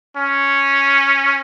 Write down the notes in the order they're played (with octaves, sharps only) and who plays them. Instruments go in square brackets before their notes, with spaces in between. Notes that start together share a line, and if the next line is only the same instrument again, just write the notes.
[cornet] C#4